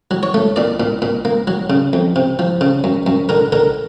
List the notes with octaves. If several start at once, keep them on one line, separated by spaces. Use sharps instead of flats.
F#3
C#5
A3
A#2 D5
A#2
A#2
A#3
F#3
C#3
F2
C3
F3
C#3
F#2
F#2
D3 A#4
D3 A#4